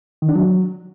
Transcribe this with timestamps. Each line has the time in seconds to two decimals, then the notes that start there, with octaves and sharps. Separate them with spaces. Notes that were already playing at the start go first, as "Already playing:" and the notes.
0.22 D#3
0.29 D4
0.35 F#3